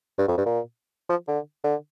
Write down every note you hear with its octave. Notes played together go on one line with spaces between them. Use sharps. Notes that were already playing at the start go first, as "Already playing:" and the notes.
G2
F2
G2
A#2
F3
D3
D3